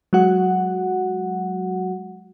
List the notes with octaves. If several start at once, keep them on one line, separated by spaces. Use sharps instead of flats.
F#3 G#3 F#4 F#5